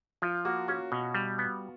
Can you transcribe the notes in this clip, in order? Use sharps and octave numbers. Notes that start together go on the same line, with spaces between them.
F3 F4
A#3 F#4
C#4 F#4
B2
G3
B3